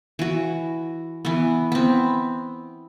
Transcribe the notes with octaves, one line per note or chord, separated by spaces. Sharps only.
E3 F#4
E3 B3
B3 C4